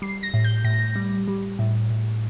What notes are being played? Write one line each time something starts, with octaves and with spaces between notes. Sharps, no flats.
G3 C7
A#6
A2
G6
A2 A#6
G3
G3
A2
A2